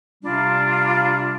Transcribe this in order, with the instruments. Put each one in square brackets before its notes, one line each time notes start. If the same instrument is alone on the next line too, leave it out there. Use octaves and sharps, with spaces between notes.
[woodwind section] C3 G3 D4 F4